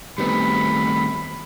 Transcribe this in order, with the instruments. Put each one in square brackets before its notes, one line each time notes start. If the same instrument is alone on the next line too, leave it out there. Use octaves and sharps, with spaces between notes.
[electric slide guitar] D#3 A3 C4 [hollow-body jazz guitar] G3 B3 [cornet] B5